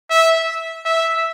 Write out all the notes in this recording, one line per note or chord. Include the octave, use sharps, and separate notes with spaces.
E5
E5